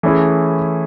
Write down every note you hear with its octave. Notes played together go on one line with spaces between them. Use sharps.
E3 A3 C#4 E4 G#4